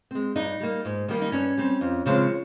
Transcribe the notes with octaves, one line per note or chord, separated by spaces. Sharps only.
G#3 C4
G2 D#4
G3 A#3
G#2
D#3 G3 A#3
D#4
G2 C#4
G3 C4
F2
C#3 F3 G#3 C4